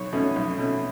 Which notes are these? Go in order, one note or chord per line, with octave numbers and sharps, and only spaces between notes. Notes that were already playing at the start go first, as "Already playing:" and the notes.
Already playing: B1 C#5
B2 A3 C#4
B1
B2 A3 C#4